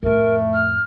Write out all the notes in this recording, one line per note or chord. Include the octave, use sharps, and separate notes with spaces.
F2 A2 A3 A#4
F6